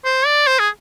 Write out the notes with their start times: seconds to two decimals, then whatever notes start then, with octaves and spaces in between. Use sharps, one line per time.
0.05 C5
0.26 D5
0.47 C5
0.59 G#4